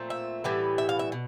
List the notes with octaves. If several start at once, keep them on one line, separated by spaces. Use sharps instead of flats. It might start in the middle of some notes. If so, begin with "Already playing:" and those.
Already playing: A#2 F3 A3 C4
E5
A2 E3 G3 B3
E5
F5
E5
B2